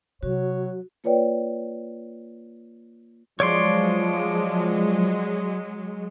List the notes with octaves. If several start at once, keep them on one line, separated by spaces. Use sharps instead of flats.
C3 F#3 F#4 C#5
A#3 F4 B4 C#5 D5 G5
F3 F#3 G#3 C#5 D5 C6